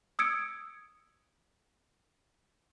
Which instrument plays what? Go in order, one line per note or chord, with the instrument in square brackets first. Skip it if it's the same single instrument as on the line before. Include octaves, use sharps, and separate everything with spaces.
[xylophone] D#6 E6 G#6 C#7 D7